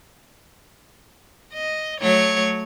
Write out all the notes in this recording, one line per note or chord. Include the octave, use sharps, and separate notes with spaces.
D#5
F#3 A3 C#5